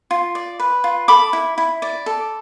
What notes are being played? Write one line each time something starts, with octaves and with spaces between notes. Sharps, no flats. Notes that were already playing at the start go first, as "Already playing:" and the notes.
F4
D5
B4
F4
A4 B5 D6
E4
E4
D5
A4